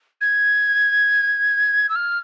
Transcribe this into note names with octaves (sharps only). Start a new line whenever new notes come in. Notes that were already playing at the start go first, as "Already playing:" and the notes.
G#6
E6
F6